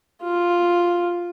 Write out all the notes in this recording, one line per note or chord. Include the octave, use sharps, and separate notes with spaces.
F4